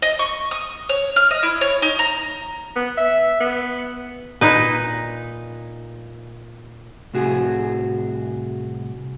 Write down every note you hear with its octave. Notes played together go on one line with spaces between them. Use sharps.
D#5
C#6
D#6
C#5
F6
D#5
E4
C#5
D#4
A#5
B3
E5
B3
A#2 D#4 B4
C2 A2 F#4 G#4